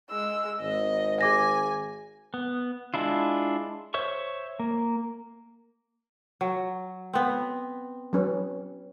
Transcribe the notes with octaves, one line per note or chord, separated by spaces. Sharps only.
G#3 E6
G#1 D#5
G#4 G#5 D6 A#6
B3
G#3 D4 E4 F4
C5 C#5 E5 C#6
A#3
F#3
B3 C4
F#3 C#4 B4